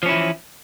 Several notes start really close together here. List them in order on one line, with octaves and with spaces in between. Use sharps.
F3 C#4 E4 E3